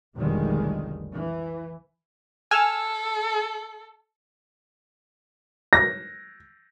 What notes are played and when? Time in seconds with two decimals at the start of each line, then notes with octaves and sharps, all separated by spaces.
0.16 F1 B1 D3 D#3 G3 G#3
1.14 E3
2.51 A4 G#5 E6 F6
5.73 A#6